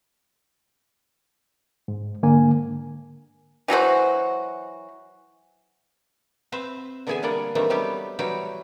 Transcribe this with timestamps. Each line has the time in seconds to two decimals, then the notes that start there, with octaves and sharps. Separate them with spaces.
1.88 G#2
2.23 G#2 D3 A#3 G#5
3.68 E3 F#3 F#4 C5
6.52 C4 B4 C5 E5
7.07 D3 E3 B3 G#4 E5 G#5
7.23 G3 A#3 D4 D5 F#5
7.55 D#3 E3 G3 A3 C4 D4
7.70 F#3 G3 B3 G4
8.19 E3 F#3 G3 F#4 F#5 G5